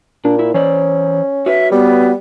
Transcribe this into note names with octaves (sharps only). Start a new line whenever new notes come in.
A#2 D4
E4
E3 C#4 C5 D5
F#4 B4 C#5 E5
G3 B3